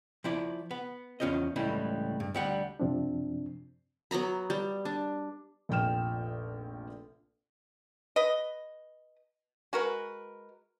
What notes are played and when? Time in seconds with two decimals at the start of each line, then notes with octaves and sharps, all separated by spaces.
0.24 F3 E4 D5
0.71 B3
1.20 E2 C#4 F4 C5 D#5
1.56 C#2 A2 E3 G3 E4
2.20 G2
2.34 D2 G3 F#5
2.80 F#2 C3 F3 C4 D4
4.11 F#3 B3 A#5 B5
4.50 G3
4.85 D4
5.69 F1 A#1 F3 G5 F6 E7
8.16 B4 D#5
9.73 G#3 F#4 A#4 B4